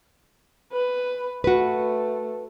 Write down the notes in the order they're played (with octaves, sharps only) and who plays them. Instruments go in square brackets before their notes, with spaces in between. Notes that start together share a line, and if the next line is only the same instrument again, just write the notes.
[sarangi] B4
[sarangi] A3 [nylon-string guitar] F#4 B4